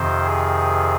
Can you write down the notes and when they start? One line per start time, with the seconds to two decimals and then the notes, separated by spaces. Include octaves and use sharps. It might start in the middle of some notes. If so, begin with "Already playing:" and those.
Already playing: F2 C3 D#3 C5
0.25 G#4